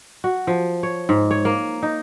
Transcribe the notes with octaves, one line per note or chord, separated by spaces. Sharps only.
F#4
F3
C#5
G#2
C#5
A#3
D#4